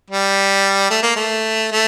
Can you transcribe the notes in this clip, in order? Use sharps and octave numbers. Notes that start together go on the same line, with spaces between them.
G3
A3
A#3
A3
A3